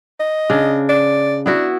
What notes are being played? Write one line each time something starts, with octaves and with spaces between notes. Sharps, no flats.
D#5
C#3 D4
D5
B3 D4 E4 F#4